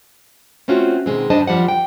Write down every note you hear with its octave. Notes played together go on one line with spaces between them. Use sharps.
A3 C4 C#4 F4 F#4
B2 D#3 G#3 C4
G2 G3 D4 C5 D#5 A5
F#2 F3 G3 C5 F#5
G5